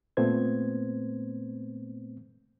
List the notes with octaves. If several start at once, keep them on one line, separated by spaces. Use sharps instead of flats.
A#2 A3 B3 C4 C5 G#6